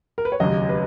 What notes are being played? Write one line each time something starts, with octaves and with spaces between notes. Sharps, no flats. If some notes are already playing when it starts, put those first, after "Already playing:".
A#4
B4
C#5
F1 D#2 C#3 F#3 D#5
B4